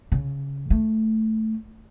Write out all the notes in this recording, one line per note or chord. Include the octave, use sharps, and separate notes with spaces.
C#3
A3